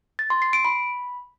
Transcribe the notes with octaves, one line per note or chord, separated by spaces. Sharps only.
A6
C6
C7
D7
B5